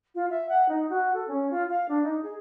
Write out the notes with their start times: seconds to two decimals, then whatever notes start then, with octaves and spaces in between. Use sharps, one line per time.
0.15 F4
0.30 E5
0.49 F#5
0.69 D#4
0.90 F#4
1.14 A4
1.28 C#4
1.51 F4
1.70 F5
1.89 D4
2.04 D#4
2.23 G#4